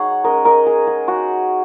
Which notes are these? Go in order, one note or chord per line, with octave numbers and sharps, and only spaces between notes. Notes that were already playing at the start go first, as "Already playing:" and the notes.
Already playing: F#3 D#4 G#4 C#5 F#5
G#3 C#4 A#4 D#5
A#4 D#5
G#4
G#4
G#3 D#4 F#4